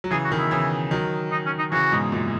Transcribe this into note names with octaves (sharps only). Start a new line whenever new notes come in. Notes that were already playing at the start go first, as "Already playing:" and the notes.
F#3
C#3 E3 G#4
F#4
B2 D#3
E4
C#3 E3
D#3 F#3
D#4
C#4
D#4
C#3 E3 F#4
G#2 B2
F#2 A#2